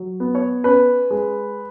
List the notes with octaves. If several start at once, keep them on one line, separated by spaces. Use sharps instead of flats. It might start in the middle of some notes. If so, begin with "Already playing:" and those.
Already playing: F#3
B3
C#5
C#4 B4
G#3